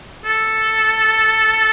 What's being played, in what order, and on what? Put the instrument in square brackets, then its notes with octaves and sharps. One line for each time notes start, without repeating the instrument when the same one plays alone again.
[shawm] A4